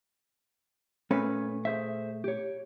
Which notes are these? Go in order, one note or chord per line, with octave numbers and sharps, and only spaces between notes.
A#2 A3 C#4 B4
G#4 C5 E5
G4 C#5